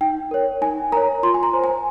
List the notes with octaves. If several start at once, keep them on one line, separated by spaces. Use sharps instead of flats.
D#4 G5
A#4 C#5
D#4 G#5
A#4 C#5 A#5
F4 C6
G#5
A#5
C5
G#5